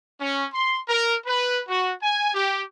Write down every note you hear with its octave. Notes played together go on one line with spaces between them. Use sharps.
C#4
C6
A#4
B4
F#4
G#5
G4